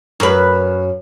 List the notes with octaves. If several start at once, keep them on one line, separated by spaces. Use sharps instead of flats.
F#2 B4